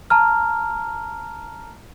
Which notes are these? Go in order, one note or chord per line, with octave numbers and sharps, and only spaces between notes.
A5 A#5 F6